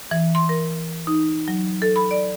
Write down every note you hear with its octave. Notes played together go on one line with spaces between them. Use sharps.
E3
C6
A#4
D#4
F#3
A4
B5
D5